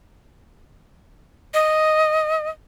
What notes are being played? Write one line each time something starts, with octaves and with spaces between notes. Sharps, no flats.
D#5